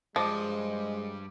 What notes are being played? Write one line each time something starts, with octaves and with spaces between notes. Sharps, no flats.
G2 F3 G3 G#3 C5 D#5 D6